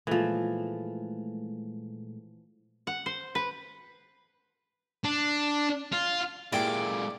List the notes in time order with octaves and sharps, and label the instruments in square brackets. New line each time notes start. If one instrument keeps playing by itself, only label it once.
[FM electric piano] A#2 G#3 A3 [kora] E3 F3
[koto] F#5
C5
B4
[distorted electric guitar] D4
F4
[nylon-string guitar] A#2 G4 [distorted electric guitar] G#3 A#3 [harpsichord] E4 G5 D6 [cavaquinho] D5